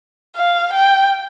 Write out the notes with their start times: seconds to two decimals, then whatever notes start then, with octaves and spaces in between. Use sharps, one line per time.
0.36 F5
0.73 G5